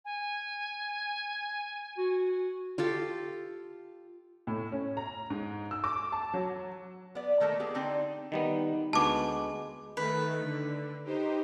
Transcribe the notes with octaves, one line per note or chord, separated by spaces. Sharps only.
G#5
F#4
F4 G4 A4
A2
C#4
A#5
G#2
E6
D6
A5
F#3
B3 D5
D#3 A3 A#3 A4
B3 G4 G#4
D3 C4 D#4 D5
D#3 G3 B3 D#4
D2 G#3 B3 A5 D6
D#3 A3 B4
D3
D#4 G4 C5